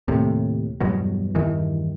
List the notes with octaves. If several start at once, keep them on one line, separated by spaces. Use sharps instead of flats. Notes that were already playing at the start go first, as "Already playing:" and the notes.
D#2 A2 C3
E2 G2 B2 F#3
E2 G2 D#3 E3